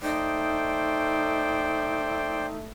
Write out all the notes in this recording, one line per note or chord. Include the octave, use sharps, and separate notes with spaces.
A3 D#4 C5 D5 G5